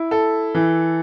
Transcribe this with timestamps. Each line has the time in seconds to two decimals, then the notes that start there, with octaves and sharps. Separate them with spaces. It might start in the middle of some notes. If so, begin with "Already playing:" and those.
Already playing: E4
0.11 A4
0.55 E3